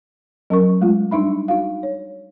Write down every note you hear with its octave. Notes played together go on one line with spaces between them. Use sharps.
F#3 C#4 A#4 C#6
G#3 A3 F4
G3 D4 D#4 E5 B5
D#4 F#4 F5
C#5